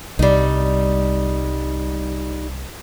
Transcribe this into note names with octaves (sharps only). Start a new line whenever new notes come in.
C2 G3 D#4